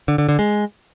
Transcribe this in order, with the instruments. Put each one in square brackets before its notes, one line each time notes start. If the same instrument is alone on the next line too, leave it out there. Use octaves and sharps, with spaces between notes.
[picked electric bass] D3
D3
D3
G#3